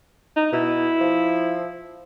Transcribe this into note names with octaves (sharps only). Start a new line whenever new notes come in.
D#4
B2 E4
F3